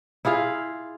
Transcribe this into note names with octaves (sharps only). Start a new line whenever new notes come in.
E4 F4 G#4 F5